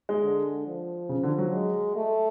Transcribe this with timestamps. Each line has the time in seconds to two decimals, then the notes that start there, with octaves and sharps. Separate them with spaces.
0.09 G#3
0.23 D3
0.67 F3
1.09 C#3
1.23 D3
1.38 F#3
1.53 G#3
1.96 A3